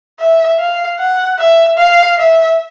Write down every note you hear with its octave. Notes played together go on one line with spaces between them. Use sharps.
E5
F5
F#5
E5
F5
E5